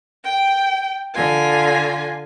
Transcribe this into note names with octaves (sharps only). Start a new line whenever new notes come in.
G5
D3 F4 G#5